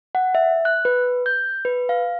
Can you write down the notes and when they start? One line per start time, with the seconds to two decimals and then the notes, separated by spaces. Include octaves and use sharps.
0.15 F#5
0.35 E5
0.65 F#6
0.85 B4
1.26 G6
1.65 B4
1.89 F5